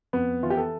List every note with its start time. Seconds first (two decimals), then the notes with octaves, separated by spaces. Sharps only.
0.13 F2 B3
0.43 E3 F4
0.50 G4
0.57 A4